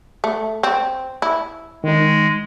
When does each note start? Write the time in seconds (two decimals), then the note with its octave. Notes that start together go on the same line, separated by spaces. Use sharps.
0.24 A3
0.63 C4
1.22 E4
1.84 D#3 G#3 D#4